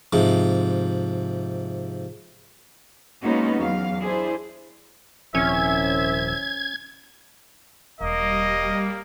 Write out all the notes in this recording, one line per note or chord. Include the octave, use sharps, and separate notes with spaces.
G#2 C3 F3
G#3 A#3 B3 C#4 D#4 F#4
E2 F#3 F5
D4 E4 G#4 C5
D#1 C2 C3 F3 C4 C#4 E5 G#6
E1 G3 A#3 D#5